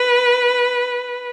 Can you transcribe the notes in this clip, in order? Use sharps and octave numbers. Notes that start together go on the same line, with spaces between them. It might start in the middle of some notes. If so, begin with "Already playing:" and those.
Already playing: B4